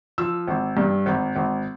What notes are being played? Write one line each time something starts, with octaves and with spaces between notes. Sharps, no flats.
F3 E6
G#1
G2
G#1
G#1